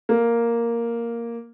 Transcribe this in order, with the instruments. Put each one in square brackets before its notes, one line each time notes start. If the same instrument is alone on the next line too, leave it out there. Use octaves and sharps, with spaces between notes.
[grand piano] A#3